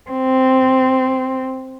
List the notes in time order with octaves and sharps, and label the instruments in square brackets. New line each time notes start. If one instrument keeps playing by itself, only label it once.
[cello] C4